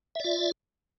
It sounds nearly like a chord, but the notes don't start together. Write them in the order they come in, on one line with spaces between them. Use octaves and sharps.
E5 D5 F4